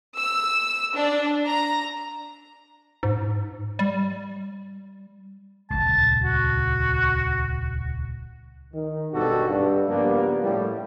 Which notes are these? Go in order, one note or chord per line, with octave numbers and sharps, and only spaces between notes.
E6
D4
A#5
G#2
G3
D#1 G#1 C#2 A5
F#4
D#3
G#1 G2 B2 F#4 G4 A4
G2
C#3 F3 G3 A#3 B3 D4
A2 G3